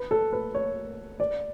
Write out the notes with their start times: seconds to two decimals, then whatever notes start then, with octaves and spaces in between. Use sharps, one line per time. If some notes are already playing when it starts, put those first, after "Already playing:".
Already playing: B4
0.11 A4
0.33 B4
0.55 C#5
1.20 D5